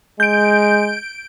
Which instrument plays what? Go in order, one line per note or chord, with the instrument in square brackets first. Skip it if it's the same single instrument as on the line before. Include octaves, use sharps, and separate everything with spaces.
[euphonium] G#3 [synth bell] G6 D7